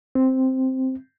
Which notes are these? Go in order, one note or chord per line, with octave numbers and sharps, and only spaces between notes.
C4